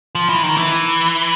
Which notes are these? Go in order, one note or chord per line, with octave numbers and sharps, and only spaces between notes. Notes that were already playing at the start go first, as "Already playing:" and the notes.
F3
E3
D#3
E3